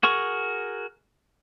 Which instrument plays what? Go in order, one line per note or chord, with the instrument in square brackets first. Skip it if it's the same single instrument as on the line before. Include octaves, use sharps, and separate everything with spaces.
[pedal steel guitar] F#4 G#4 A#4 C#6